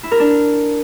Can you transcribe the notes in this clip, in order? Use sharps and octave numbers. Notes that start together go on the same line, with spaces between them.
E4
A#4
D4